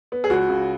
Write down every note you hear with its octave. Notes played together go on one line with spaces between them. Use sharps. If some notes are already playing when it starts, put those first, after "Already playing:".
B3
G#4
C#2 F#4
C#3